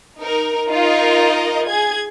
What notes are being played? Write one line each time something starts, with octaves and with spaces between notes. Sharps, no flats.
D#4 A#4
D#4 F4 A#4 D#5
G#4 G#6